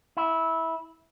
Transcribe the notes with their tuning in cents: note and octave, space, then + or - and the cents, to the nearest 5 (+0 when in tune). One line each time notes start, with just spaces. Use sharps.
E4 -15